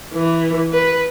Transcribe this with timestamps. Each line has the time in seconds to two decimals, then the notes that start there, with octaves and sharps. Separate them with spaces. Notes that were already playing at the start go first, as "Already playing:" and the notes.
0.14 E3
0.73 B4